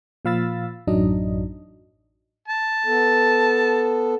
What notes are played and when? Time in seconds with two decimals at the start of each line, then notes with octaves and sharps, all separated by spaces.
0.25 A#2 F3 F5 B5 E6 A6
0.87 A1 F#2 F#3 D4 D#4 D#5
2.48 A5
2.86 B3 A4